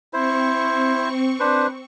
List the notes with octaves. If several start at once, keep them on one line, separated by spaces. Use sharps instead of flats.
C4 E4 C5 C#6
D4 B4 C5